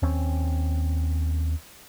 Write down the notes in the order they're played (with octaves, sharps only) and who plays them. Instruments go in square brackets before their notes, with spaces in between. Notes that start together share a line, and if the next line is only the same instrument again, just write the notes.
[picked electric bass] D#2 C4 C#4